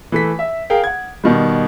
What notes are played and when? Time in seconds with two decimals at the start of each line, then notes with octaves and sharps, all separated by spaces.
0.12 E3 A3 B6
0.39 E5
0.70 G#4 A#4 F5 G5
0.84 F#5 G#6
1.24 B2 D#3 G3